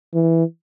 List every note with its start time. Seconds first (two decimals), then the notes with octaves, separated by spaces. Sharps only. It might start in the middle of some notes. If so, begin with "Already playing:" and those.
0.14 E3